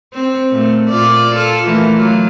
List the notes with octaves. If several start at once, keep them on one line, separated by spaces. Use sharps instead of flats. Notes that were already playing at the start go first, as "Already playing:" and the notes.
C4
A#2 A3
A#2 F4 D5
F4 A4
E3 A3 A#3
F#3 F4